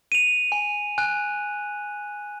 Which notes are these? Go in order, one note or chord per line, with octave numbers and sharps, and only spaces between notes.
D#7 F7
G#5
G#5 F#6